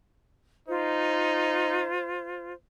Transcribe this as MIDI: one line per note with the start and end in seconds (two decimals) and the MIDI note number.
0.68 1.88 63
0.68 2.53 65
0.68 2.53 72